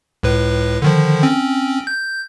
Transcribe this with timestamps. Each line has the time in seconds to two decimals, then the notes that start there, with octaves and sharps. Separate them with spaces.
0.23 C#2 A2 B4
0.82 D3 D#3 F3
1.23 C4 C#4
1.87 G6